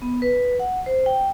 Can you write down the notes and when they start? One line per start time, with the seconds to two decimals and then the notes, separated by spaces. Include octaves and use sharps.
0.02 B3
0.22 B4
0.59 F#5
0.86 C5
1.06 G5